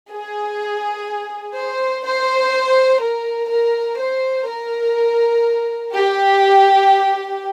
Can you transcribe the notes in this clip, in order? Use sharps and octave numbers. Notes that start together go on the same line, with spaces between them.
G#4
C5
C5
A#4
A#4
C5
A#4
G4